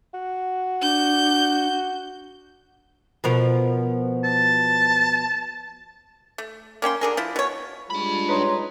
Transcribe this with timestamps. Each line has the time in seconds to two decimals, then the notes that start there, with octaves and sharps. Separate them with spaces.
0.14 F#4
0.82 D4 G6
3.24 B2 F3 A#4
4.24 A5
6.38 A3
6.82 A#3 C#4 G5 C6
7.01 D3 G#4 A#4
7.17 F3 E4
7.36 B2 C#5
7.90 G3 G#3 D4 F4 B5
8.28 D#4 B4 C#5 A#5 C6